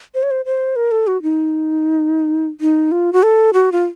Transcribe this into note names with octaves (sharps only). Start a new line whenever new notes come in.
C5
C#5
C5
C5
A#4
A4
F#4
D#4
D#4
F4
F#4
A4
F#4
F4